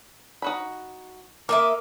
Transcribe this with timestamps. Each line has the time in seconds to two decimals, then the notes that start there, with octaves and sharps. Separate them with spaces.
0.42 D#4 F#4 B5
1.49 A#3 A#4 D#5 E5 D6